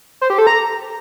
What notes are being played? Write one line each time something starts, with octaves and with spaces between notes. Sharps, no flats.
C5
G4
A4
A#5